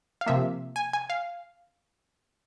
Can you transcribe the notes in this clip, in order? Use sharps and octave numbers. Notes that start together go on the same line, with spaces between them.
F5
C3 F3 A#3 E5
G#5
G#5
F5